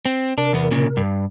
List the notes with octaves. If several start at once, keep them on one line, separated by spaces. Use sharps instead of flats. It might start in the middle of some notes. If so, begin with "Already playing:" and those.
C4
C3 D4 A#4
E2 B3
A#2 C#3
G2